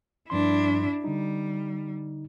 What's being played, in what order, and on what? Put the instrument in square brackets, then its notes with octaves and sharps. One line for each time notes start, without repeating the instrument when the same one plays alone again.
[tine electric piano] G2 F3 C6 [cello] D4 E4
[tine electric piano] D3 D#4 [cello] G3